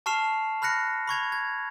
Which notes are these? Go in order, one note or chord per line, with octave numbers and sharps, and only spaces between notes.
A5 C#6 F6 C7 E7 F7
B5 F6 F#6 A#6 C#7
B5 C#6 G#6 F7
G#6